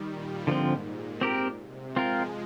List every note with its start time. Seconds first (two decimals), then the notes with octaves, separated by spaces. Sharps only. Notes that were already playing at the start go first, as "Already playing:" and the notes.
Already playing: D#3 G3
0.10 A#2
0.47 G#2 D3 F3 C4
0.84 A#2
1.21 C4 G4 A#4
1.58 C3
1.96 F3 G#3 C4 F4 A#4